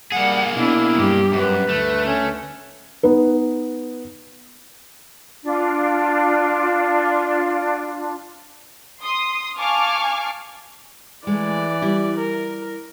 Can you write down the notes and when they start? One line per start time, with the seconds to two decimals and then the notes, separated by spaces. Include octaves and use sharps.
0.12 G3 A#3 G#4 F#5
0.55 B2 D4 E4
0.95 G2 G4
1.33 F#2 B4
1.69 D2 A3
2.06 C#4
3.03 B3 D#4 B4
5.44 D4 F4
9.01 C6 D#6
9.58 F5 G#5 A5 C#6 D6 F6
11.27 E3 G#3 A3 D5
11.82 G3 E4
12.19 A#4